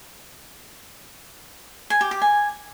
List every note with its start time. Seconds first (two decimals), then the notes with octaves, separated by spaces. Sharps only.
1.90 G#5
2.01 G4
2.11 G4
2.22 G#5